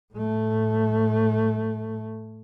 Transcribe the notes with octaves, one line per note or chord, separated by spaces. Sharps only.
A2 A3